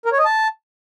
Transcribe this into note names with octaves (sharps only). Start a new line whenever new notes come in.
A#4
C#5
D#5
A5